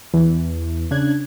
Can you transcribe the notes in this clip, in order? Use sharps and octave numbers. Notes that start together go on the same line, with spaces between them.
E2 E3
C#3 D4 F#6 G#6